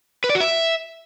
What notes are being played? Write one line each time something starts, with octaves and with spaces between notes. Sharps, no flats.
B4
D5
F#4
E5